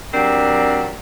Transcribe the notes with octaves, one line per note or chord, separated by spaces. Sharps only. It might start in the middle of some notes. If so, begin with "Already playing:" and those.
F#3 C4 D4 G4 A#4 D5